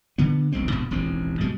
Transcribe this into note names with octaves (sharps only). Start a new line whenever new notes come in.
D3 B3
E1 B1 G#3 C4
E1 D2 G#2 B2
E1 A1 D#2 C4
B2 G3 G#3